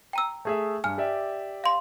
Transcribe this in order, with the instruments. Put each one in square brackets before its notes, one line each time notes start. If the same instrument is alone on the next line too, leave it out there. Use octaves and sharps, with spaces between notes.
[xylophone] G5 A#5 E6
[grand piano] A3 G#4 E5
[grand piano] G2 [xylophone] G#5 F6
[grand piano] G4 D5 E5
[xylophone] F5 C6